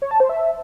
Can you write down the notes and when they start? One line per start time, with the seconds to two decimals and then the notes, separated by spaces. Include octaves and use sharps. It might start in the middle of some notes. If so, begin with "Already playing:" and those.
0.02 C#5
0.11 A5
0.20 C5
0.29 E5